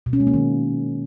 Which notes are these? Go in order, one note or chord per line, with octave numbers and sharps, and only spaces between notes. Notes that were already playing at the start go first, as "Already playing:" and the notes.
B2
C#4
G#3
A#3
D#3